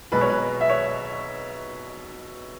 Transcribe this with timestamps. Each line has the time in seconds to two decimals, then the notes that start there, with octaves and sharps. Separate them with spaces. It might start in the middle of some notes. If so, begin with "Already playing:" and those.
0.12 B1 B2 G#3 B4
0.21 C#5
0.30 B4
0.61 E5
0.69 C#5